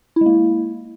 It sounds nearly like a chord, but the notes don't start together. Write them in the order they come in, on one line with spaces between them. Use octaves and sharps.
E4 G#3 A#3